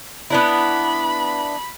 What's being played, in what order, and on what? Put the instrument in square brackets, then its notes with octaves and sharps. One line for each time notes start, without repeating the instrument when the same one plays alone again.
[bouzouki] B3 D4 E4 [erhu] B5